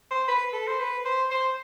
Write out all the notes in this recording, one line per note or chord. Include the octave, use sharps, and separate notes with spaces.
C5
B4
A4
C5
B4
C5
C5